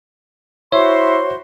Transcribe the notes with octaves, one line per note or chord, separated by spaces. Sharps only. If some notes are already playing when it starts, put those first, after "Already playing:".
E4 F#4 C5 C#5 C6